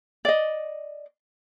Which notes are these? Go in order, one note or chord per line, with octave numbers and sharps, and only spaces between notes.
D5 D#5